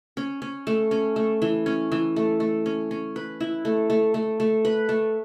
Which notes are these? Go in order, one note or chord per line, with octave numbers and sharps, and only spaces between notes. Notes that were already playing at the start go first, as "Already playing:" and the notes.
C#4
C#4
A3
C#4
A3
E3
C#4
E3
A3
A3
C#4
C#4
B4
E4
A3
A3
A3
A3
B4
A3